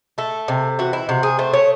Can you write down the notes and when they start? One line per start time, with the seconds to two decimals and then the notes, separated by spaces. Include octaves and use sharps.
0.18 A3 A4
0.48 C3
0.79 E3 F#4
0.93 E4
1.09 C3 F#4
1.23 G#4
1.39 A3 C5
1.53 C#5